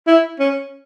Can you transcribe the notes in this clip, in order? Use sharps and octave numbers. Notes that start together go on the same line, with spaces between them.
E4
C#4